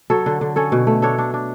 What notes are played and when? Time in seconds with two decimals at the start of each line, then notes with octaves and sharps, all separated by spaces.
0.10 F#3 A4 C#5
0.26 D3
0.41 D3
0.56 C#4 A4 C#5
0.72 B2
0.87 A3
1.02 D4 A4 C#5
1.18 D4
1.34 D4